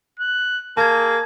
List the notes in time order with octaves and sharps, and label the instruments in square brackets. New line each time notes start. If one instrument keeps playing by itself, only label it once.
[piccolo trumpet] F#6
[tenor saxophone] A#3 [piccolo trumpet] G#4 [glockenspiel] A5 G#6